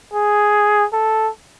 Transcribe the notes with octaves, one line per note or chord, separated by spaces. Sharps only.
G#4
A4